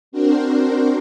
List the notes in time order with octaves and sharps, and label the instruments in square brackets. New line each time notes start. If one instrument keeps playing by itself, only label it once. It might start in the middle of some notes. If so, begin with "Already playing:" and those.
[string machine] C4 D4 F#4 A#4 C5